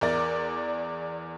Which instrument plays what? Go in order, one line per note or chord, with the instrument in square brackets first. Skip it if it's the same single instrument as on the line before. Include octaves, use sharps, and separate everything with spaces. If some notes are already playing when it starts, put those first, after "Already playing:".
[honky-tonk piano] E2 A#4 D5 A6